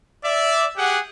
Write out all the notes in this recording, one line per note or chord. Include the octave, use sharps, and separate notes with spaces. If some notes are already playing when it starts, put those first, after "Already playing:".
D5 E5
G4 G#4 F#5